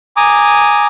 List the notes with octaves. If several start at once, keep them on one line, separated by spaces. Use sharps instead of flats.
G#5 A#5 D6 D#6